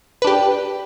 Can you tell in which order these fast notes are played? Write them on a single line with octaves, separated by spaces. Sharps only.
B4 D4 G4